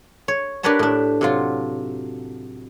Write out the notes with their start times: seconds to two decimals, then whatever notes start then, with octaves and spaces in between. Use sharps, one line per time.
0.28 C#5
0.63 D4 G4 A#4 B4 C#5 A5
0.79 A2 D4
1.21 C3 F#3 F4